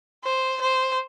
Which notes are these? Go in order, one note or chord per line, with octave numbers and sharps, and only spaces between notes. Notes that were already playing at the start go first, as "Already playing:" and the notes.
C5
C5